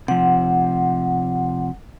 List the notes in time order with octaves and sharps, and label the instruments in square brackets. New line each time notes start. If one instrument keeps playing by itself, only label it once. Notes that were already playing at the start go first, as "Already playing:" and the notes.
[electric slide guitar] C3 F3 [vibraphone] F#5